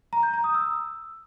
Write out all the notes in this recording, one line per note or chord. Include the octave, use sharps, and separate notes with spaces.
A#5
G6
A#5
D#6
E6